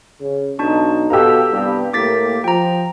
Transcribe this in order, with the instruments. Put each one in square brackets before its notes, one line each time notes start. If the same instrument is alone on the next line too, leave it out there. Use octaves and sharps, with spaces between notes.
[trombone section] C#3
[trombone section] B1 D#4 [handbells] D4 A5 C#6
[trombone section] B2 A4 [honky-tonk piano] G4 F5 [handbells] A#5 E6
[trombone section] C2 G2 B3
[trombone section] A2 A#3 [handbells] D6 A6 B6
[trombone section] F3 [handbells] G5 A#5